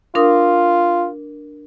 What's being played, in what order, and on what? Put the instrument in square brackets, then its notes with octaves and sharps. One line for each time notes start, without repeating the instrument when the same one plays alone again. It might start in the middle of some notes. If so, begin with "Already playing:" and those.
[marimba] D4 A#4 D#6 [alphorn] F4